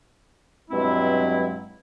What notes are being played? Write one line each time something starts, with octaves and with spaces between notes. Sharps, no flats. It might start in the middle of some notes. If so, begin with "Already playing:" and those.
G2 B2 F#3 G#3 C4 E4